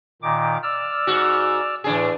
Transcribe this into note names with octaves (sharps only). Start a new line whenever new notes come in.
A#2 D#3 D6
D5 E6 F6
G#2 F#4
A2 E3 D4 G#4